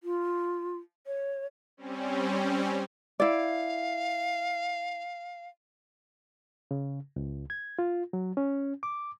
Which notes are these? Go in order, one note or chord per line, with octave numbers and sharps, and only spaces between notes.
F4
C#5
G3 C4 C#4
E4 D5 F5
C#3
C#2
G#6
F4
F#3
C#4
D6